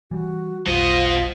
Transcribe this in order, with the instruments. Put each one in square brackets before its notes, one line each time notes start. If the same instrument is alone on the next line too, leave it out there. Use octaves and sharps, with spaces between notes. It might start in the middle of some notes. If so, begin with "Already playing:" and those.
[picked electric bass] E3 G3 [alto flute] F#4
[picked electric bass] F1 B1 G3 [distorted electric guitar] B2 D#5 [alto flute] F4 [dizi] C5